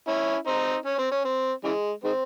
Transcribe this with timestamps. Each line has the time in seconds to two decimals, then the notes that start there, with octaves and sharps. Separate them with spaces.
0.08 C#4 E4
0.47 C4 D#4
0.86 C#4
0.98 C4
1.11 C#4
1.25 C4
1.64 C#3 E3 G#3
2.04 D#3 G#3 C4